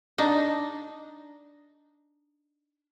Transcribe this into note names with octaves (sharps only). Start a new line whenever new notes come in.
D4 D#4